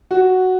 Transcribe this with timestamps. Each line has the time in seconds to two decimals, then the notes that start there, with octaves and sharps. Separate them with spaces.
0.11 F#4